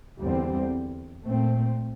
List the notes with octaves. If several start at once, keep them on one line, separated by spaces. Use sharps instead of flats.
E2 D3 G3 C4
A#2 A3 C4